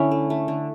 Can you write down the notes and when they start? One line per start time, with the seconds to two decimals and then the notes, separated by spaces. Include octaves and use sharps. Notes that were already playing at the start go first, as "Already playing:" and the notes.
Already playing: D3 C#4 E4
0.11 A3
0.30 A3
0.48 D3